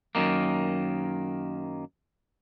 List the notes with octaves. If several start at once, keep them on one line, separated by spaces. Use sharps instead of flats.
F#2 D#3 A#3